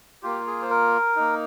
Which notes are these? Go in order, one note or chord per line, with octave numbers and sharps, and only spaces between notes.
A#3 F4 G4
G#4
C5
A#4
A#3 D#4